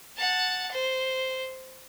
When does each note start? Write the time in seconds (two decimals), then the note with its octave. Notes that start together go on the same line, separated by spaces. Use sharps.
0.17 F#5 A5
0.72 C5